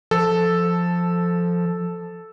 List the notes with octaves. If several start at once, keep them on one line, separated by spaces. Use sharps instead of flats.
F3 A4